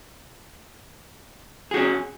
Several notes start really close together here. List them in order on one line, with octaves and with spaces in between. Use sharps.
G#4 F#4 C#4